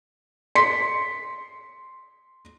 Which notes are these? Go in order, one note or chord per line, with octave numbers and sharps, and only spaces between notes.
C6 B6 C#7